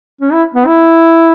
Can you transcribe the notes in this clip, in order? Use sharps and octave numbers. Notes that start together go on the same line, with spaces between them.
C#4
E4
B3
E4